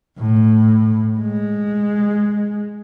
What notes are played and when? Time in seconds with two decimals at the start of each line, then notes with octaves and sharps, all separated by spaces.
0.18 A2
1.19 G#3